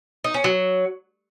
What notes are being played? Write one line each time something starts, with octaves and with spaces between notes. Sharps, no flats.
D#4
C#4
F#3